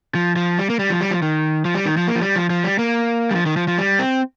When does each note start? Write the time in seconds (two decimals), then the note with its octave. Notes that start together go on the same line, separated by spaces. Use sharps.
0.15 F3
0.36 F3
0.58 G3
0.70 A#3
0.79 G3
0.90 F3
1.01 G3
1.11 F3
1.22 D#3
1.65 F3
1.75 G3
1.86 D#3
1.97 F3
2.07 A#3
2.15 F3
2.22 G3
2.36 F3
2.50 F3
2.64 G3
2.79 A#3
3.31 G3
3.35 F3
3.46 D#3
3.56 F3
3.68 F3
3.78 G3
3.99 C4